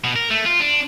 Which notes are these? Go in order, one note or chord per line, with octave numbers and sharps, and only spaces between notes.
B2
A#4
A3
F4
D4